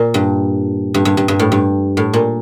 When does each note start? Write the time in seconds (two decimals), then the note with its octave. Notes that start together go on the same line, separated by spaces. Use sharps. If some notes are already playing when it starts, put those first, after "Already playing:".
Already playing: A#2
0.14 G2
0.94 G2
1.05 G2
1.17 G2
1.28 G2
1.39 A2
1.52 G2
1.97 A2
2.13 A#2